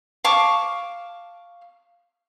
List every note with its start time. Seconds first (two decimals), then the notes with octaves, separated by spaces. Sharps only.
0.24 F5 A5 C#6 D6